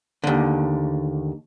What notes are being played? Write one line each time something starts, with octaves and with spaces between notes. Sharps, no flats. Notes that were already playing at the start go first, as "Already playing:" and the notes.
D#2 D3